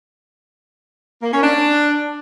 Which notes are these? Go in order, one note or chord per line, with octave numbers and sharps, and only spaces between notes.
A#3
C#4
D4